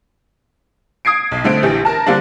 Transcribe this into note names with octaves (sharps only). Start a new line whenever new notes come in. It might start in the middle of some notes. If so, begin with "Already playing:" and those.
D#6 G#6 C7 D7
B1
D3 A3 C4 D7
A#1 E3 G4
A#4 A5
D3 G3 A#3 C4 D4